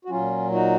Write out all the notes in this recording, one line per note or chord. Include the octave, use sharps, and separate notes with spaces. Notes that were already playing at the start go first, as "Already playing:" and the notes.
F#4
A#2 F#3 C#4 F4
D#4 F#4